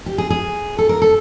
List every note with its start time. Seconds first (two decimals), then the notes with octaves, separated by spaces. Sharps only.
0.06 G4
0.18 G#4
0.30 G#4
0.78 A4
0.89 A#4
1.02 A4